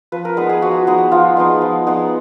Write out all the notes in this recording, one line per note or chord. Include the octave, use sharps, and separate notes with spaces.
F3 B4
A#4
G#3 B3 D#4 B4
G#4
F3 F#4
G#3 B3 D#4
F3 F4
G#3 B3 D#4
F3
G#3 B3 D#4